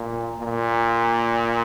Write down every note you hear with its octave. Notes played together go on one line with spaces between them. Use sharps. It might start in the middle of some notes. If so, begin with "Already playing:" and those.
Already playing: A#2
A#2